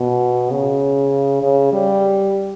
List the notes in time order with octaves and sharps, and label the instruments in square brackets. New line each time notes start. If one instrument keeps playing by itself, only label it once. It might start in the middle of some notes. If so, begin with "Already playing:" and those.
Already playing: [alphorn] B2
C#3
C#3
G3